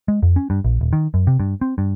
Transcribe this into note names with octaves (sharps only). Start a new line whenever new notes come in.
G#3
F2
C#4
G2
A#1
D#1
D#3
F#2
C3
G2
C4
G2